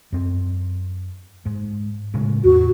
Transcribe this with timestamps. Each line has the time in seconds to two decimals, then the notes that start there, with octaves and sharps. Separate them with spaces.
0.12 F#2 C4
1.46 G#2
2.14 A2 C#3 G#3
2.44 E2 A2 F#4